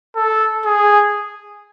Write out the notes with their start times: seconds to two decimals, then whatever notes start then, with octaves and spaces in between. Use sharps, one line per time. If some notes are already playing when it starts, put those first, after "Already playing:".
0.16 A4
0.66 G#4